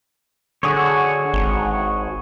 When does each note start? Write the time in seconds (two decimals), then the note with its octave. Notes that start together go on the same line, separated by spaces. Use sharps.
0.63 D3 F#4 G#4 C#5
1.34 G#1